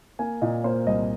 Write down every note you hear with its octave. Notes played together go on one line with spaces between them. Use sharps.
A#3 G#5
A#2 D#5
A#3 C5
C2 D#5